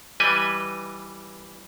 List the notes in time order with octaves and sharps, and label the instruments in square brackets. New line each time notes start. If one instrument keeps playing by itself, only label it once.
[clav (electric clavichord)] E3 G3 B4 D#5 G#5